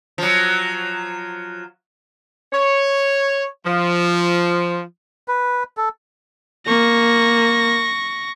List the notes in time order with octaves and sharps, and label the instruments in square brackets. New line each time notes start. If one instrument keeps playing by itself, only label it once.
[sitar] F3 F#3
[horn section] C#5
F3
[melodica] B4
A4
[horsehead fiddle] A#3 [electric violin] C#6 A#6